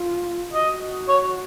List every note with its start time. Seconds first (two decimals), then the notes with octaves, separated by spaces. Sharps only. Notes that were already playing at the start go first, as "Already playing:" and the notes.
Already playing: F4
0.53 F#4 D#5
1.09 C#5